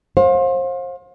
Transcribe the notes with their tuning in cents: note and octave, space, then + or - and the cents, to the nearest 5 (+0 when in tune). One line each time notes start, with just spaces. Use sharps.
C5 +30 F5 +30